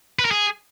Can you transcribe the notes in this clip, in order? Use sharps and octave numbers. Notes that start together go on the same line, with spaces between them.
B4
A#4
G#4